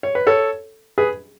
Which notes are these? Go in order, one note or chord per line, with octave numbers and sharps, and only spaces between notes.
C#5
B4
A4 C#5
G#4 B4